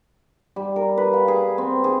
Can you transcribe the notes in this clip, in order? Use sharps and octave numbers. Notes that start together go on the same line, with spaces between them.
G3
A#4
B4
F5
G#4
C4
G#4